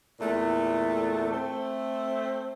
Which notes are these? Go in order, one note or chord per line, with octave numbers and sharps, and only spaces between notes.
E2 A#2 A3
A3 C4